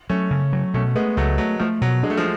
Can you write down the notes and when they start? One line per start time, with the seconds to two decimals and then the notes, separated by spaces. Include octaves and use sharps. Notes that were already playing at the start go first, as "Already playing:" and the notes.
0.09 F#3 A3 C#4
0.31 C#3
0.53 F#3
0.74 B2 A3 C#4
0.95 G#3 A3 B3
1.17 C#2 F#3 A3
1.38 F#3 A3
1.60 F3 A3
1.81 B2 F#3
2.03 G#3 D4
2.10 A3
2.18 F3 G#3